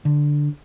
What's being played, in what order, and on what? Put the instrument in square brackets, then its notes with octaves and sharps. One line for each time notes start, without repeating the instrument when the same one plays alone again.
[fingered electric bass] D3